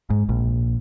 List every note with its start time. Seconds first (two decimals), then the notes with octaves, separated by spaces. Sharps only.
0.10 G#2
0.29 A#1